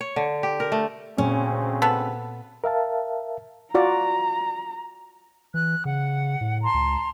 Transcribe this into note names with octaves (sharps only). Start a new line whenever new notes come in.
C#5
D3
G4
A#4
A3
D2 A#2 C#3 C4 C#4
B3 A4 B4
A#4 E5 F5 A5
F4 F#4 D5 A#5
E3 F#6
C#3 F#5
A2
A5 A#5 C6
C#2